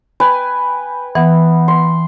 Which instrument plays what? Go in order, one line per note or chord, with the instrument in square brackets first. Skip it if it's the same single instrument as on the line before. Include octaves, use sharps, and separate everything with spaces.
[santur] B4 G5 G#5
[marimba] E3 [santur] B3
[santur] C6